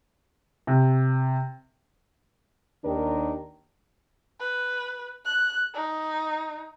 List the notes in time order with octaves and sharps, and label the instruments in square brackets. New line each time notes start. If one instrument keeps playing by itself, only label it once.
[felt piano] C3
[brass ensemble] D#2 D#3 D4 A#4
[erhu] B4
F#6
D#4